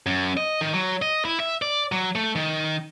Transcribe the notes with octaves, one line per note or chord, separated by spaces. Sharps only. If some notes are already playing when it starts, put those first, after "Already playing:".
F#2
D#5
D#3
F#3
D#5
E4
E5
D5
F#3
A3
D#3